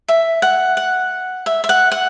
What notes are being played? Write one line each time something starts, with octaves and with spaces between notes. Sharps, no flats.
E5
F#5
F#5
E5
E5
F#5
F#5